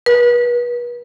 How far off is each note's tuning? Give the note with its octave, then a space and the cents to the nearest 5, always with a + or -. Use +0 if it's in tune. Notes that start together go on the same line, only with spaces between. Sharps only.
B4 -35